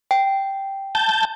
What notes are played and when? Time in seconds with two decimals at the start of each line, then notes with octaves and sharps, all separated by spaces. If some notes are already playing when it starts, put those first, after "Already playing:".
0.11 G5
0.95 A5 G6